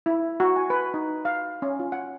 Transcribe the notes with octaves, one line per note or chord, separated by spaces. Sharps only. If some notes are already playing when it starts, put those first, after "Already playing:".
E4
F#4
G#5
B4
D#4
F5
C#4
F4
F#5